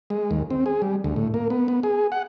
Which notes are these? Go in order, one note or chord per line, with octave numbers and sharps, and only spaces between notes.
G#3
D#2
C4
G#4
G3
D2
A2
A#3
B3
B3
G#4
F#5